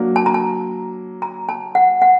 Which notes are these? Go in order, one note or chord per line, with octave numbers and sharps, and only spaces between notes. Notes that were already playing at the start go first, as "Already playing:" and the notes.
Already playing: F#3 A#3 D4
A5
A#5
A5
A#5
A5
F#5
F#5